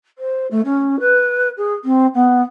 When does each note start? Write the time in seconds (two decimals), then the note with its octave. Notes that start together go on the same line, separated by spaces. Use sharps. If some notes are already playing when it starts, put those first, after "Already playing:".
0.18 C5
0.51 A3
0.65 C#4
1.00 B4
1.57 G#4
1.84 C4
2.14 B3